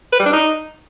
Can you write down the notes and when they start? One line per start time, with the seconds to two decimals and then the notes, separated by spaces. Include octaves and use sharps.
0.12 B4
0.19 G3
0.26 D4
0.33 D#4